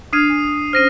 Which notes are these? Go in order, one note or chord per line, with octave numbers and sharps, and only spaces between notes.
D4 D#6 F6 G#6 C7 D#7
G#5
C#4 C5 F6 A#6 D#7